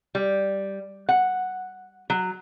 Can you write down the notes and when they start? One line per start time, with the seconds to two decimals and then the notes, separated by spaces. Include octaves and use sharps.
0.15 G3
1.09 F#5
2.10 F#3